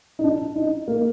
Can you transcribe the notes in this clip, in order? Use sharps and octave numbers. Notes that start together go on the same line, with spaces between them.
D#4
D4
D#4
A#3